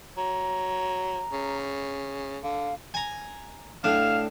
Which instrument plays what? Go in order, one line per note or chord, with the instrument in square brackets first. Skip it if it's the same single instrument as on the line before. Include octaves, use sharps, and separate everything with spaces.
[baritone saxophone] F#3 [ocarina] A#5
[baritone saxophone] C#3
[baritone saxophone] D3 [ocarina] F5
[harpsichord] G#5 A#5
[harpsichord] A2 D4 [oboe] F5